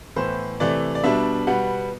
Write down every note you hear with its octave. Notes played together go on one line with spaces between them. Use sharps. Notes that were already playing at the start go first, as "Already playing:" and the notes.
A2 E3 B3 C5
C3 E3 A3 D5
D5
B2 G3 B3 D4 E5
B2 G3 B3 F#5